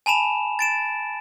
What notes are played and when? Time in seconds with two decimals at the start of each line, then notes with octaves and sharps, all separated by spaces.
0.06 G#5 A5 B5 E7 F7
0.59 A6 D7 E7